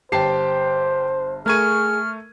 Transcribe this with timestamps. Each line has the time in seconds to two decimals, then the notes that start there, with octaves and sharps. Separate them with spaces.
0.12 G1 G4 C5 G5 A5 C7
1.46 A3 G#4 A#4 C#6 F6 G#6 D#7